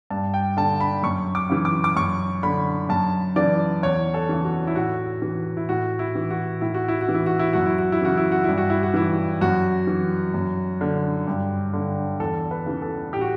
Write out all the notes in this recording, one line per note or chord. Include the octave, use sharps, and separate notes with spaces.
G2 A5
G5
D3 A5
B5
F#2 C#6
D6
C#3 E3
D6
D6
F#2 C#6
D3 B5
F#2 A5
C#3 E3 D5
E2 C#5
A4
C#3 E3
F#4
E4
A2 F#4
E3
E4
A2 F#4
E4
E3
F#4
A2 E4
F#4
E4
F#4
E3
E4
F#4
E4
F#2 F#4
E4
F#4
E4
C#3 E3 F#4
E4
F#4
G2 E4
F#4
E4
F#4
E3 E4
F#2 F#4
E3
F#2
D3
G2
D3
E2 A4
B4
C#3 E3
A4
A2 G4
F#4